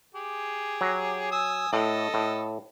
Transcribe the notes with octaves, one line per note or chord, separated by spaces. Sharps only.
G4 G#4
F#3
G#5 D#6 E6
A2 A4 D#5
A2